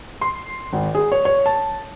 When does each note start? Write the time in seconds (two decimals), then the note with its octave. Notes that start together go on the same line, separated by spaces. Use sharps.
0.21 C6
0.73 G#1
0.95 G#4
1.12 C#5
1.25 C#5
1.46 A5